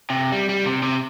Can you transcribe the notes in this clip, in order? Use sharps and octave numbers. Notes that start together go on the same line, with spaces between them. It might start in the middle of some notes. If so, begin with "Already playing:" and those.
C3
G3
G3
C3
C3